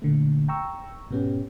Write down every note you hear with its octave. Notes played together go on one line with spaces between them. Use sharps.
A#2 D3 A3
G5 A#5 C#6 E6
G#2 B2 B3 C#4 G4